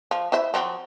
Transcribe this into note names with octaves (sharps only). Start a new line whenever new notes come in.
F3
E4 C5 E5
F3 F#3 C4